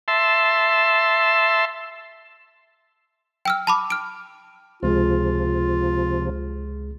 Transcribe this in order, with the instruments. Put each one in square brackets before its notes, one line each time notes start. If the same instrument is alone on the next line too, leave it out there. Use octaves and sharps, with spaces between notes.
[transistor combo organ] E5 A5 C6
[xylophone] G5 E6 F6
A5 B5 D6
F6 D7
[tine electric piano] C#2 G#3 G#4 [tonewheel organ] C3 F3 [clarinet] F4